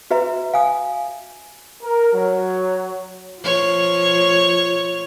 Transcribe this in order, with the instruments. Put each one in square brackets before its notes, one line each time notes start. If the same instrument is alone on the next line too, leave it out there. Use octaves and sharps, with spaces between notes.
[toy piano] F#4 B4 E5 A#5
F5 G#5 D#6
[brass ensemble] A#4
F#3
[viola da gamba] F3 C#5